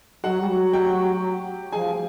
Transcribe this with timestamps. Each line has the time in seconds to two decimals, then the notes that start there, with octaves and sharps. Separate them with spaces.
0.24 F#3 F#4 F#5
0.40 G3
0.49 F#3
0.73 G4 G5
1.72 F3 G#4 G#5